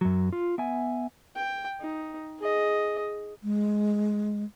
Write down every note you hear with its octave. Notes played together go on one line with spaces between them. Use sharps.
F#2 F#3
F4
B3 E5 G#5
G5
D#4
G#4 D#5
G#3